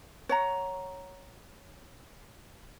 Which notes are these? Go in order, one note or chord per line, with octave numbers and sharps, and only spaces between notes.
C#5 F#5 A#5